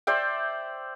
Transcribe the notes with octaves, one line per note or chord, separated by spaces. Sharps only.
C5 D5 E5 G5